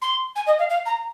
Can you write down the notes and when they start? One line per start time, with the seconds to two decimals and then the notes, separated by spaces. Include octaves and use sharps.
0.02 C6
0.36 G#5
0.47 D#5
0.59 F5
0.70 F5
0.86 A#5